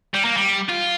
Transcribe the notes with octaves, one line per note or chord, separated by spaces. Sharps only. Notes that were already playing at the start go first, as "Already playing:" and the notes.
G3
A#3
G3
F4